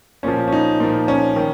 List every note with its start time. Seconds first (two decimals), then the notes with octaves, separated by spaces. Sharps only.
0.23 A#2 F3 C#4
0.48 C#4
0.52 D#4
0.80 A#2 F3
1.08 C#4
1.36 D#3